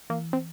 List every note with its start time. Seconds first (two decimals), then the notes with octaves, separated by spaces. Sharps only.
0.10 E3 A#3
0.33 C4